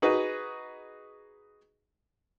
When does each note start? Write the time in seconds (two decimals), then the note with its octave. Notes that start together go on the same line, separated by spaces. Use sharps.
0.02 D#4 F#4 G#4 B4